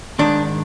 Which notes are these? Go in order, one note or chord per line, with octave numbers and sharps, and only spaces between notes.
G#2 D#3 D4